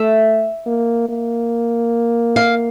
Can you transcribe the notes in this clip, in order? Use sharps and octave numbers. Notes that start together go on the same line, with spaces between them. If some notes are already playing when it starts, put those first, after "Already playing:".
Already playing: A3 E5
A#3
A#3
F5